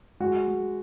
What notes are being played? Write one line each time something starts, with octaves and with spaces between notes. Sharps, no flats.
G#3 F#4
G#3